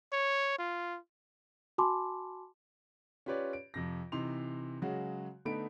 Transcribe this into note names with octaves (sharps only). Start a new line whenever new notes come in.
C#5
F4
F#4 G#5 A5 B5 C6 D6
C#4 F4 G4 B4 C#5 D5
D7
F2 C3 A#6
C3 E3 D#4 C6 F7
C#3 F#3 G#3 F#4
D3 A3 B3 D#4 B5 D7